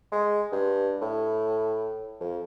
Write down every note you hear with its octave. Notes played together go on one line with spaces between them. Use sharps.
G#3
G2
A2
F2